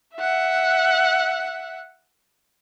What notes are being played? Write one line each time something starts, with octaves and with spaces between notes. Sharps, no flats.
E5 F#5